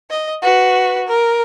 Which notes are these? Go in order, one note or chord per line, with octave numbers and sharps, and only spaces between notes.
D#5
F#4 B4
A#4